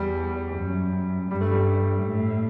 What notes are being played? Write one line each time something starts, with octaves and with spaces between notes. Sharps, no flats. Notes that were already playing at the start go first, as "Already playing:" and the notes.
Already playing: E2 G3
F#2
G2 G3
A3
G3
A2